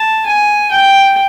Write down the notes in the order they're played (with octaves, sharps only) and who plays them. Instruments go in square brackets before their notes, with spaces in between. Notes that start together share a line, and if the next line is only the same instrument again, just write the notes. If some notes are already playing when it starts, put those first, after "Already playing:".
Already playing: [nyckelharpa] A5
G#5
G5